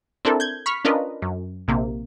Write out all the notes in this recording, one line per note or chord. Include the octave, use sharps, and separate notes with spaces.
C4 D4 E4 A4 A#4
G6 G#6
B5 C#6 F6 B6
C#4 D4 F4 A#4 B4 D#5
F#2
A#1 C3 A#3